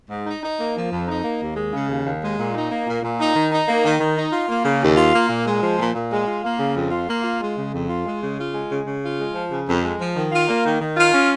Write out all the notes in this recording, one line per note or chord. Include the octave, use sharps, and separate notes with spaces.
G#2
D#4
D#4
A#3
F3
F2
D#4
A#3
D#2
G#3
C#3
D#2
D#2
G#3
A#2
D#4
A#3
A#2
A#2
D#4
D#3
D#4
A#3
D#3
D#3
D#4
F4
A#3
C#3
D#2
F4
A#3
A#2
G#3
F3
A#2
A#2
G#3
F4
A#3
C#3
F2
F4
A#3
F4
G#3
C#3
F2
F4
G#3
C#3
F4
G#3
C#3
C#3
F4
G#3
F3
C#3
F2
G#3
F3
D#3
F4
A#3
D#3
D#3
F4
C#4